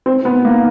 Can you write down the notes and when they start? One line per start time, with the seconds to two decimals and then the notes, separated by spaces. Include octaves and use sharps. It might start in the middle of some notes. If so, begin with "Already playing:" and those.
0.06 C4
0.25 B3
0.45 A#3